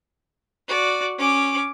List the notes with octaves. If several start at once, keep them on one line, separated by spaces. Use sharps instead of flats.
F#4 D5
C#4 D6